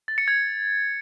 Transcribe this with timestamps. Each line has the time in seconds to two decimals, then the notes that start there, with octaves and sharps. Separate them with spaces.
0.08 A6
0.18 C#7
0.28 G#6